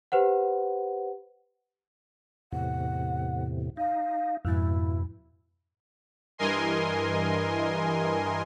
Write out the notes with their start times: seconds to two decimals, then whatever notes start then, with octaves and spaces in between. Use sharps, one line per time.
0.12 G4 B4 C5 F#5
2.52 E2 A2 C3 F#5
3.77 D#4 F5
4.45 F2 G#2 B2 E4
6.38 G2 E3 A#4 D#5 G#5 C6